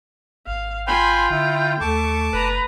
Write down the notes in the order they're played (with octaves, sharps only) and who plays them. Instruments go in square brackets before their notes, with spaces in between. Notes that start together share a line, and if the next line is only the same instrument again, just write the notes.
[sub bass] G#1 [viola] F5
[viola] F4 [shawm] G5 [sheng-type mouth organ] G#5 B5 C6
[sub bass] D3 [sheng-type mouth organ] E4
[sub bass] D#2 [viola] A3 C#6 [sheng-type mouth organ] A5 D6
[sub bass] F#1 [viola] B4 A#5